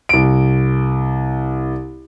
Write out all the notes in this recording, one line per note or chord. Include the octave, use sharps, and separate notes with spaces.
C2 D7